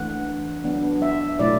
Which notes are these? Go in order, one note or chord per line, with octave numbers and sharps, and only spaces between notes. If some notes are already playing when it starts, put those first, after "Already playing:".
Already playing: E3 A3 D4 F#5
F#3 B3 D4
E5
B2 F#3 A3 E4 D5